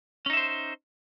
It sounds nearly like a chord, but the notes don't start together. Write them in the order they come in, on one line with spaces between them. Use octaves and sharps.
C#4 D#4 E5 C5